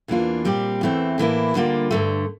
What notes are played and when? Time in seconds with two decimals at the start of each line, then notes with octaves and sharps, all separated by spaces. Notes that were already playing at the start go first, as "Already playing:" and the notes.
0.08 E2 E3 A#3 D4 F4
0.45 A#2 G3 C4 G4
0.81 E2 E3 A3 C4
1.18 A2 E3 A#3 E4
1.54 D2 D3 G3 A#3 F4
1.91 G2 D3 A3